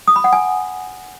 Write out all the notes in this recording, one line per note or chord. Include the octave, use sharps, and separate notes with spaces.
D#6
B5
F#5
G#5